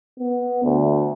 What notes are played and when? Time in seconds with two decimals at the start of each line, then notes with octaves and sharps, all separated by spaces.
0.20 B3
0.64 D2